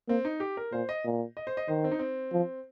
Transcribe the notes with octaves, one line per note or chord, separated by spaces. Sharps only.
A#3 C4
D#4
G4
A#4
A#2 C5
D#5
A#2
D#5
C5
D#5
D#3 C5
C4
D#4
C4
F3